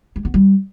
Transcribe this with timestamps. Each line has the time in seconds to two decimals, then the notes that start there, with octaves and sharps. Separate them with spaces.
0.16 G#3
0.25 B3
0.34 G3